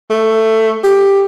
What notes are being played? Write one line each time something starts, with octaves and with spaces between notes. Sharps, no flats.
A3
G4